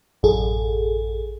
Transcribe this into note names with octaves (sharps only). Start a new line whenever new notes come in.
A1 F#2 G#4 A4